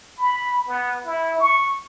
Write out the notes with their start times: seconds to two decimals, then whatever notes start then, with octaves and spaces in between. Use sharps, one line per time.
0.17 B5
0.67 B3
1.05 E4
1.40 C#6